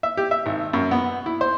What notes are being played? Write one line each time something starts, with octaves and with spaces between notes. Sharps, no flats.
E5
G4
E5
G#1
F#2
B3
E4
C5